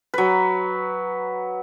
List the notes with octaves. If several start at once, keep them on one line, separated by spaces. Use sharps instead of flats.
F#3 B4